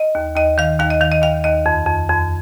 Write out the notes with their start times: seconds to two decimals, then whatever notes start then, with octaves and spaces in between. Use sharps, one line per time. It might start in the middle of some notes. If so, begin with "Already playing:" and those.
Already playing: D#5
0.15 D#2
0.36 D#2 D#5
0.58 D#3 F5
0.79 D#2 F5
0.90 D#5
1.01 D#3 F5
1.12 D#5
1.22 D#2 F5
1.44 D#2 D#5
1.66 F2
1.87 F2
2.09 F2